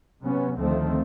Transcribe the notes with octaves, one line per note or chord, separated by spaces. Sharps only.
C3 F#3 B3 C#4
D2 D#3 F3 A3 C4